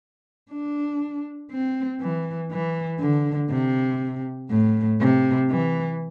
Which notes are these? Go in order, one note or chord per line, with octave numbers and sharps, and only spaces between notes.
D4
C4
E3
E3
D3
C3
A2
C3
E3